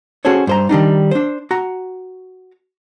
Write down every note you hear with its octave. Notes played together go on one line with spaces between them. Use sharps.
C#4 F#4 G#4 A4 C5 C#5
G2 C5 A#5
D#3 G3 D4 D#4
D4 C5
F#4 A#5